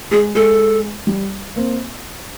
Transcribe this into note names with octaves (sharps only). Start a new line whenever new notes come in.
G#3 G#4
G#3 A4
G3
A#3 C4